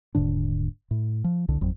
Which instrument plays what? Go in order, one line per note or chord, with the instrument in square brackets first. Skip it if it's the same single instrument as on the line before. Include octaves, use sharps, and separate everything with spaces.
[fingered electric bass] D#1 G#2 D3 D4
A2
F3
C2 D3
G#1 F2 F#3